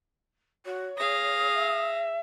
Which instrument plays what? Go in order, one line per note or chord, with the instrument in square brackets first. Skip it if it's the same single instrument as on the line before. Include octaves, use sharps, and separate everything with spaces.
[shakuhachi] F#4 [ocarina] C#5
[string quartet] G#4 F5 A#6 [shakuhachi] D#6
[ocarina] E5